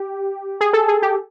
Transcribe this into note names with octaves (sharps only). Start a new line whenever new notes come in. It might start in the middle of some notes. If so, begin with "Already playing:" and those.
Already playing: G4
G#4
A4
G#4
G4